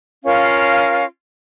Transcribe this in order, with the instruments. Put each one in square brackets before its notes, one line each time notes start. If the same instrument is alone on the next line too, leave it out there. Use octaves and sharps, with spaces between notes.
[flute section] C#4 F4 A#4 F5